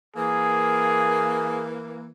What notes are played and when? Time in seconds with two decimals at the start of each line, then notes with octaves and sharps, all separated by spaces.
0.16 E3 A#3 G#4